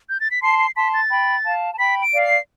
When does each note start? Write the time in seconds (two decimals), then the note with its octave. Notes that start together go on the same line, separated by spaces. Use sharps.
0.09 G6
0.20 A6
0.31 B6
0.42 A5 C6 C7
0.59 C7
0.76 A5 C6 B6
0.94 A6
1.11 G5 B5
1.45 F5 A5
1.74 A5
1.79 G5 B5 B6
2.02 D7
2.12 D5 F5
2.24 C7